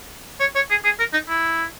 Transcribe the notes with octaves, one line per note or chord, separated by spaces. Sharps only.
C#5
C#5
G#4
G#4
A#4
D#4
E4